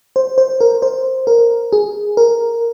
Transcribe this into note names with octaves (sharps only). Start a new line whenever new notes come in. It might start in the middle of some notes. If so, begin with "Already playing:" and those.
C5
C5
A#4
C5
A#4
G#4
A#4